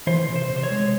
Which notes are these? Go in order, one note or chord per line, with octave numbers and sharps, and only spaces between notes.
E3 C5
C3
C5
C3
C5
C#5
G#3